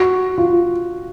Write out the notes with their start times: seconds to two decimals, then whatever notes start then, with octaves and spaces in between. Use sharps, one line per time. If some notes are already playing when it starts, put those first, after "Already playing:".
Already playing: F#4
0.38 F4